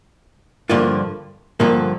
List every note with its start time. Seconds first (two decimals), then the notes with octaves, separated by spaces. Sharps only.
0.70 G2 D3 F3 A#3 F4
1.60 G2 D3 F3 A#3